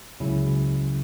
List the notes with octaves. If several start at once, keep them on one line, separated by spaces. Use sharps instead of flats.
C#2 C#3 F#3 C#4 E4